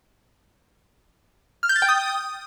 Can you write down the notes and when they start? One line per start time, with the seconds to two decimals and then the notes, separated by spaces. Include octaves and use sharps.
1.63 F6
1.69 G6
1.76 A6
1.82 G5
1.89 D#6